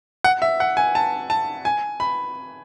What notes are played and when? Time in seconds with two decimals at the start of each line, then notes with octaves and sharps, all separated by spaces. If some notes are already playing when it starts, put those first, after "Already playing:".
0.24 F#5
0.42 E5
0.60 F#5
0.77 G#5
0.95 A5
1.30 A5
1.65 G#5
2.00 B5